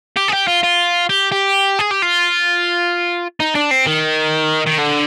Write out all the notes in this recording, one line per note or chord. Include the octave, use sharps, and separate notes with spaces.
G4
G#4
G4
F4
F4
G4
G4
G#4
G4
F4
D#4
D4
C4
D#3
D#3
D3